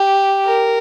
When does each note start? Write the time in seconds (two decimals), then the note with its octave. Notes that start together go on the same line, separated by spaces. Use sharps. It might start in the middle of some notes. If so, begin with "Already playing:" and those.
Already playing: G4
0.46 A#4